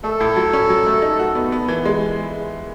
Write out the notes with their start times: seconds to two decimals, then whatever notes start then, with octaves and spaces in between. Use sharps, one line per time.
0.04 A3 A4
0.20 A2
0.36 F#3
0.53 C#4
0.70 F#3
0.86 A3
1.02 D#4
1.19 F#4
1.35 B3
1.52 B3
1.68 E3
1.85 G#3